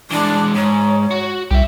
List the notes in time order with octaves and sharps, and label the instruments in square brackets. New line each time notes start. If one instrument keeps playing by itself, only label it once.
[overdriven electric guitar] E3 G#3 [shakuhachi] D4
[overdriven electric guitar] G#2 [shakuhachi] C#5
[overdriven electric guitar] F#4
[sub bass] C2 [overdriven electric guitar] G4 E5